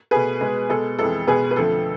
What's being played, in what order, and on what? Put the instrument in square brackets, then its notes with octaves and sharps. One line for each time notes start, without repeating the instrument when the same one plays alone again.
[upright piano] B2 A3 G#4 B4
B2 G#3
B2 G#3 A4
F2 E3 G#3 A4
B2 G#3 G#4 B4
B4
F2 D3 F3 A3 A4